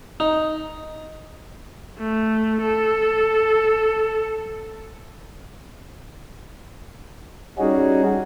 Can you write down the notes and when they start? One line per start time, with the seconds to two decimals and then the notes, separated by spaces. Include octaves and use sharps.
0.20 D#4
1.99 A3
2.62 A4
7.58 G3 C#4 D#4 F#4 G#4